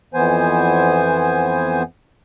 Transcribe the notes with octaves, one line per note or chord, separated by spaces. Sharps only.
F2 E3 B3 C5 G#5